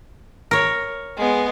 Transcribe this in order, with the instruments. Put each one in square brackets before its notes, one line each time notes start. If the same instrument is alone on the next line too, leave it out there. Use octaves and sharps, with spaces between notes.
[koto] A#4 C#5
[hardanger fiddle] G#3 B3